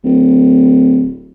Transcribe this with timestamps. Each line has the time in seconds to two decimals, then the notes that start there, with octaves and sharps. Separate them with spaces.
0.04 D1